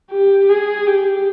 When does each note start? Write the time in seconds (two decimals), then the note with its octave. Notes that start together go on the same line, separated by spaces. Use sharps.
0.11 G4
0.49 G#4
0.87 G4